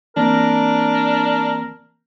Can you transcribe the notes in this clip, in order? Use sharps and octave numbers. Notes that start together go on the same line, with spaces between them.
E3 A#3 C4 D4 A#4